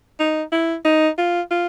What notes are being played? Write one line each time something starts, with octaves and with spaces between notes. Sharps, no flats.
D#4
E4
D#4
F4
F4